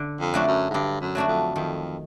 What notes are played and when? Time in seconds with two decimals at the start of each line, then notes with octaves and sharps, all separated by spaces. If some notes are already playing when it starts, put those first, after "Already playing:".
Already playing: D3
0.20 F2
0.34 F#3 A3 D4 F#4
0.48 F#2
0.70 G#2
0.74 G2 D3
1.01 F#2
1.15 F#3 A3 D4 F#4
1.28 F2
1.55 F2 D#3